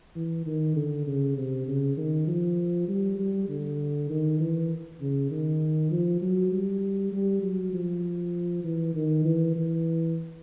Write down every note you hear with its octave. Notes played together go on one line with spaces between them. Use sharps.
E3
D#3
D3
C#3
C3
C#3
D#3
F3
G3
G3
D3
D#3
E3
C#3
D#3
F3
F#3
G3
G3
F#3
F3
E3
D#3
E3
E3